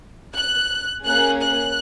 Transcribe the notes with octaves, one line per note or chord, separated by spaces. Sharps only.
F#6
A#3 C#4 G#4 F#6
F#6